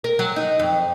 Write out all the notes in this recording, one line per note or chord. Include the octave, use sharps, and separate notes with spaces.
A#4
F#3
D#4
F2